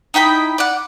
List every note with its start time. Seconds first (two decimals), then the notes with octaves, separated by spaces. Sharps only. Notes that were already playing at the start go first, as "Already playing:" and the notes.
0.14 D#4 E4 G5 B5
0.58 D5 F#5